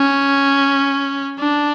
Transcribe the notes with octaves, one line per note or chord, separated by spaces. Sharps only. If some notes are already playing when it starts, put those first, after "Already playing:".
Already playing: C#4
D4